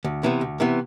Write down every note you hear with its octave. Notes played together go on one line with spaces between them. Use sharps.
D2
C3 E3 B3
D2
C3 E3 B3